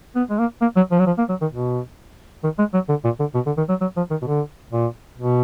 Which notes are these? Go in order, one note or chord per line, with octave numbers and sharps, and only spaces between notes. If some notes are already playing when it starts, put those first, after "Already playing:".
B3
G#3
A#3
A#3
F#3
F3
F#3
F3
A#3
F#3
D#3
B2
D#3
G#3
F#3
D3
A#2
D3
B2
D3
D#3
F#3
F#3
F3
D#3
B2
D3
A#2
B2